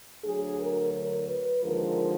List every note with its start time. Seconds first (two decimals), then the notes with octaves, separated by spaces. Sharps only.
0.23 D2 D3 F#3 G#4
0.59 A#4
0.93 A#4
1.28 B4
1.62 D#2 D3 F3 G#3 A#4